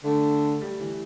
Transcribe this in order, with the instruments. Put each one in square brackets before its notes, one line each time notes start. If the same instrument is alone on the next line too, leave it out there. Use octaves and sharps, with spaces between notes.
[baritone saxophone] D3 [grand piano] A3
[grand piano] G3
E3